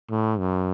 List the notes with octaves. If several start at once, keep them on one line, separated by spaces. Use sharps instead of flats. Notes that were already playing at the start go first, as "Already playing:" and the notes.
A2
F#2